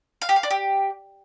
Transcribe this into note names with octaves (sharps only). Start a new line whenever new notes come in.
F5
G4
F5
D5
G4